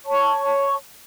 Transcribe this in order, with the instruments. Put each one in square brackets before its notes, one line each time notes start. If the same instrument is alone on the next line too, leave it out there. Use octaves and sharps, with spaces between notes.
[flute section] C#5 A5 C#6